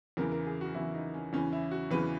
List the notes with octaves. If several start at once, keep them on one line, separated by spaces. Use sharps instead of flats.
E2 C#3 E3 A#4
A#4
G#4
F#4
E2 C#3 E3 E4
D#4
C#4
E2 C#3 E3 C#4
E4
F#4
E2 C#3 E3 B4